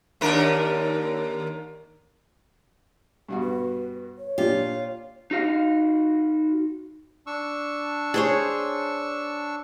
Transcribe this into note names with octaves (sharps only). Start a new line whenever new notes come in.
D#2 D4 A#4
G2 B2 F#4
B4
C#5
A#2 D4 F4 G4
D#4 F#4 F5
D4 C#6 E6
G#4 C5 C#5